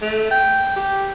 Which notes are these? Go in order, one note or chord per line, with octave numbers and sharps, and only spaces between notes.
A3
G5
G4